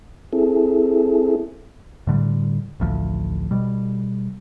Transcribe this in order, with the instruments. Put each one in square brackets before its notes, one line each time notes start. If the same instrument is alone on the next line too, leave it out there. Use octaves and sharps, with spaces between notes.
[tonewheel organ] C4 E4 G#4 A4
[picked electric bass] A2 D3 G3
A1 D2 F3
B2 G3